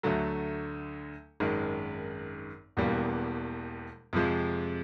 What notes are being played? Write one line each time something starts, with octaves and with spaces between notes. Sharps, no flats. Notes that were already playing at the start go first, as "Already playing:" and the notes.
D2 D3 F#3 A3
G#1 F#2 D#3 G#3
E1 E2 B2 G3 A#3
F2 C3 F3 G#3